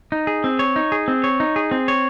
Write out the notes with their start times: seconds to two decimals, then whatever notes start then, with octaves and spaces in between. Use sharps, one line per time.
0.12 D#4
0.27 G#4
0.44 C4
0.59 C#5
0.76 D#4
0.92 G#4
1.08 C4
1.24 C#5
1.40 D#4
1.56 G#4
1.71 C4
1.88 C#5